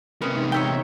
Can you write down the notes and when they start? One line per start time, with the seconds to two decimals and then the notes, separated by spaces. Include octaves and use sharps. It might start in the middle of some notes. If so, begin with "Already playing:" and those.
0.22 C3 A#3 C#4 B4 D#5
0.35 E2 G#2 C3
0.52 D#3 C#5 E5 G5